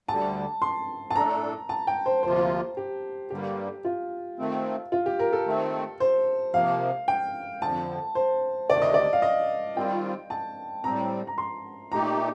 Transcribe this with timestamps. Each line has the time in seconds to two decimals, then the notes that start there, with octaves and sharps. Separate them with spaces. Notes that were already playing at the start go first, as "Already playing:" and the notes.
0.08 D2 D3 G3 A5
0.62 C6
1.10 A5
1.16 A2 A3 D4 A4 A#5
1.69 A5
1.87 G5
2.06 C5
2.23 D2 C3 F3 A#3 F4 C5
2.77 G4
3.30 G2 D3 G3 A#3 G4
3.85 F4
4.39 D#3 A3 C4
4.92 F4
5.06 G4
5.19 A#4
5.33 A4
5.46 D#3 A3 C4
6.00 C5
6.53 C3 F3 A#3 F5
7.08 G5
7.61 F2 D3 F3 A5
8.15 C5
8.69 D2 C3 D#3 A3 D5
8.82 D#5
8.94 D5
9.13 F5
9.22 D#5
9.77 D#3 G3 C4 F4 G5
10.30 A5
10.84 A2 G3 C4 A#5
11.27 A#5
11.38 C6
11.92 A#2 A3 D#4 G4 A#5